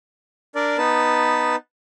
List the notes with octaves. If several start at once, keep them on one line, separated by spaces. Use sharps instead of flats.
D4 A#4 D5
B3 D#4 B4 A5